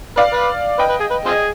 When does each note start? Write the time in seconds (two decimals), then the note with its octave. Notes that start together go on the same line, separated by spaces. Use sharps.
0.17 B4 D5 F5
0.33 B4
0.79 B4 D#5 G5
0.90 B4
1.00 G#4
1.11 B4
1.26 C4 F4 G#4
1.31 D#5